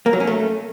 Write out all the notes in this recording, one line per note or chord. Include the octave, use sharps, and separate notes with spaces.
A#3
F#3
C#4
A3